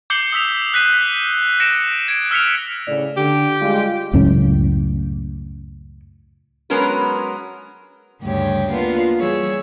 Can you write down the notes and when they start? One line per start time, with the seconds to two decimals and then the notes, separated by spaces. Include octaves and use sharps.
0.10 D6 G6 C7 C#7 F#7 G7
0.33 D#6 E6 B6 F7
0.74 F#6 B6 D#7
1.60 A#6 C#7 D7 E7
2.08 G#6 D7
2.31 E6 F6 B6 C#7 F7
2.86 A2 C#3 D5
3.17 D3 G4
3.61 G3 G#3 F4
4.13 C#2 F#2 A2 C#4
6.70 F#3 G#3 B3 C#4 A#4 B4
8.22 D2 G2 C#3 G4 C#5
8.70 A#3 B3 D4 F4
9.17 E3 G3 G#4 C#5 E6